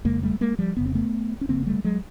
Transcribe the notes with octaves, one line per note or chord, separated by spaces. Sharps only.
F1 F2 C#3 G#3 A#3
G3 A3
G#3 A#3
F3 G3
F1 F2 C#3 B3
C4
A3 B3
C#4
F1 F2 C#3 A#3 C4
G3 A3
F#3 G#3